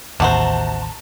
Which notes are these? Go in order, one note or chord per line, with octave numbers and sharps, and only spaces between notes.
A1 D#2 C3 F#4 C5 A5 A#5